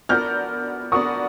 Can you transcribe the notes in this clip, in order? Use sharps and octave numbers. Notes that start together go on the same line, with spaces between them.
B3 D4 F#4 A#4 F6 G6
B3 D4 F#4 A#4 C#6 D#6